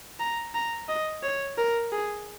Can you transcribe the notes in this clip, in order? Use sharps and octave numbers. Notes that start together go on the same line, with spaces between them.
A#5
A#5
D#5
C#5
A#4
G#4